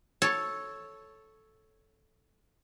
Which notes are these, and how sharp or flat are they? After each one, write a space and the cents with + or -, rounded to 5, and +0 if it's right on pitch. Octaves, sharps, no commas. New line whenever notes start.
A4 -5 C#5 +0